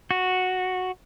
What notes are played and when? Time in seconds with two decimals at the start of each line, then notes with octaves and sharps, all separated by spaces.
0.11 F#4